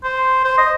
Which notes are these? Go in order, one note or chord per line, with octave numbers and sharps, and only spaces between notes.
C5
C5
D#5